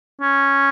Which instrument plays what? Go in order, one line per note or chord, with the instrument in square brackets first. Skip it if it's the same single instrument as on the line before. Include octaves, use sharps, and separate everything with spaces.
[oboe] C#4